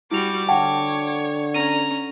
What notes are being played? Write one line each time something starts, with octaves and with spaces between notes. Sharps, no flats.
G3 E4 F#4 D6 F7
D3 C#5 F#5 G5 A5
C#4 A#5 D#7